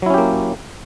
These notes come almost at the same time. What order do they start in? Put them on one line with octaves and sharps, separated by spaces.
F#3 E4 C#4 G4 A#3